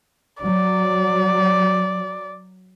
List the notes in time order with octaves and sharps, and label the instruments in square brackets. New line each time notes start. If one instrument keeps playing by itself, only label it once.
[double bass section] F#3 [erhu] D5